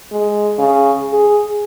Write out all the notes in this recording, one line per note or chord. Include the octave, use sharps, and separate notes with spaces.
G#3
C#3
G#4